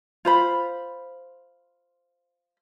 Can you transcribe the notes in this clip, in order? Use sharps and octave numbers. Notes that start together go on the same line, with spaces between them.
F4 C5 B5